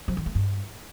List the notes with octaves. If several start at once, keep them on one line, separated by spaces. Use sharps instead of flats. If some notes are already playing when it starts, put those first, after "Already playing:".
F3
D#3
A3
G2